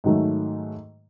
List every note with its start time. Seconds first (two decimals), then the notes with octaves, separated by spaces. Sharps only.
0.04 G#2 D#3 F#3 A3